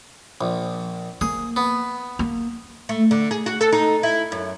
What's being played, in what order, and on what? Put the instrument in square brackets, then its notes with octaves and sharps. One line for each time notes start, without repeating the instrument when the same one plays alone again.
[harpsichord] A#1
[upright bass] A#3 [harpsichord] G#4
[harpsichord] B3
[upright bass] A#3
[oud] A3
D3
G#4
F#4
A4
D#4
E4
F#2